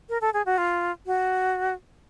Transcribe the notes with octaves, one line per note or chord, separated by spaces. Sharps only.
A#4
A4
G#4
F#4
F4
F#4